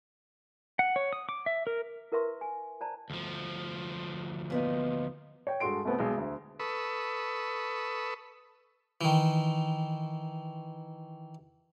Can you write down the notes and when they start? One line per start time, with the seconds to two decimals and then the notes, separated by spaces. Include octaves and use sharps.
0.79 F#5
0.96 C#5
1.13 D#6
1.29 D6
1.46 E5
1.67 A#4
2.12 E4 A#4 B4 E5 C6 C#6
2.41 G#5
2.81 C5 D5 A5 A#5
3.10 D2 F3
4.50 A#2 B3 D#4
5.47 C#5 G5
5.60 G2 G#3 F#4 A4 C6 D7
5.85 C2 A3 B3 C4
5.98 B1 G#3
6.17 D2
6.60 A4 B4 B5 C#6 D#6 E6
9.01 D#3 E3